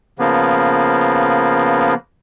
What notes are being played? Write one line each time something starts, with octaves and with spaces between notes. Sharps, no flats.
C#3 F3 A#3 B3